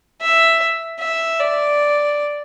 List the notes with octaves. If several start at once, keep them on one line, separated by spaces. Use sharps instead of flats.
E5
E5
D5